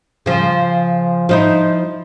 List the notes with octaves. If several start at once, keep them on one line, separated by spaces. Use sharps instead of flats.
C#3 F3
F3 D#4 E4